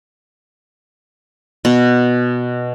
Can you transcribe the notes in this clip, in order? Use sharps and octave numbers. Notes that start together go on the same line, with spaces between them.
B2